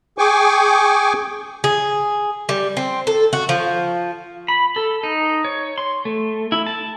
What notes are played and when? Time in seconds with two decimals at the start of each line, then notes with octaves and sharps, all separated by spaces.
0.18 G#4 G5 G#5 C#6 D6
1.64 G#4
2.49 G3
2.77 C4
3.07 A4
3.33 F#4
3.49 F3
4.48 B5
4.76 A4
5.03 D#4
5.45 C#5
5.78 C6
6.05 A3
6.52 E4
6.66 A5